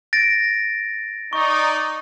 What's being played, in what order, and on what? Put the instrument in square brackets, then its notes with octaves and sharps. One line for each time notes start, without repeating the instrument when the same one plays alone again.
[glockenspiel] A6 A#6 D7
[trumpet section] D#4 D5 [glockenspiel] C#6